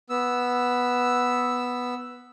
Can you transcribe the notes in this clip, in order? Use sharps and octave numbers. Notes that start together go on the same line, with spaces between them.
B3 E6